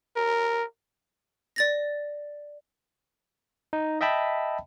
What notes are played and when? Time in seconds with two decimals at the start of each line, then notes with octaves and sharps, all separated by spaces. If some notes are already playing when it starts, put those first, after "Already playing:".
0.16 A#4
1.56 D5 A6 A#6
3.73 D#4
4.01 D#5 E5 G5 A5 B5